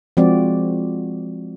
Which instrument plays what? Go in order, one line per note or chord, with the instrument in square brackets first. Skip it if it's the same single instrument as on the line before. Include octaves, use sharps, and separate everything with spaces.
[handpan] F3 G#3 C4 F#4 D5